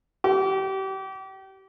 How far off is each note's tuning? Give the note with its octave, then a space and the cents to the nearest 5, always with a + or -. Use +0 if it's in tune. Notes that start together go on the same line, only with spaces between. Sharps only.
G4 -30